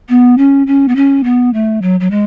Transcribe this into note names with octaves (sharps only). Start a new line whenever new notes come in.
B3
C#4
C#4
B3
C#4
B3
A3
F#3
F#3
G#3